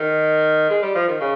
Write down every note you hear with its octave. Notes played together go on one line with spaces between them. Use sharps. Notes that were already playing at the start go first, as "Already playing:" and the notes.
Already playing: D#3
G#3
G3
F3
D#3
C#3